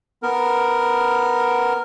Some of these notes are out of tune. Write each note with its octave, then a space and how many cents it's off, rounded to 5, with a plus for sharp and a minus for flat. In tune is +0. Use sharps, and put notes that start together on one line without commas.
B3 +0 D#4 +45 A#4 +0